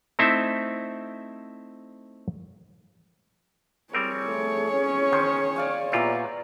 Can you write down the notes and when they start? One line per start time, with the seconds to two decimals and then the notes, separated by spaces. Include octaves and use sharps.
0.19 A3 C4 D#4 E4 C5 E5
3.93 G3 C4 G#4 A#4 C#5
4.27 A3
4.72 C#4
5.12 D#3 C5
5.56 D5 F5 G#5
5.92 A#2 B3 E4 F4 G4 D5 A#5